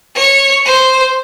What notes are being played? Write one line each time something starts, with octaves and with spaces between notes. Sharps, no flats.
C#5
C5